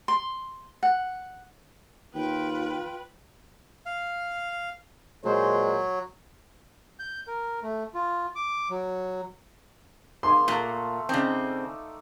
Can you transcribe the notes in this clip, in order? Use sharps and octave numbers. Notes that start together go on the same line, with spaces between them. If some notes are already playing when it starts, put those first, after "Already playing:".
C6
F#5
D#2 F4 B4 G5
F5
A#2 F#3 G#3 C5
G6
A#4
A3
F4
D6
F#3
A#3 G#4 G#5 C6
A#2 A3 F5 F#5
C#3 A3 C4 D#4 D5